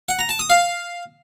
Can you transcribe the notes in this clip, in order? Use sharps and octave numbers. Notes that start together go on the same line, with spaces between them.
F#5
A#5
A5
D#6
F5